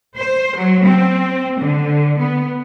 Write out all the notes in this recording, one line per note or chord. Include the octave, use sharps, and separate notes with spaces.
C5
F#3
C4
D3
B3